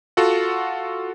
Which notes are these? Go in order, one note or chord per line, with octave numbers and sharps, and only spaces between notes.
F4 F#4 A4 F#5